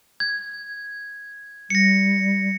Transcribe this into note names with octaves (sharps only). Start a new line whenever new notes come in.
G#6
G3 A#6 C#7